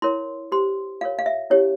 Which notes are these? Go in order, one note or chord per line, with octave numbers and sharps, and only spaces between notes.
E4 A#4 C#5 C6
G4 C5 C6
F4 A#4 C#5 F5
F5
E5
C#4 E4 G4 C#5